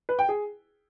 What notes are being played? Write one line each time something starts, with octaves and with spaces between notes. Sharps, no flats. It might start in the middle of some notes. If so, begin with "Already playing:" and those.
B4
G5
G#4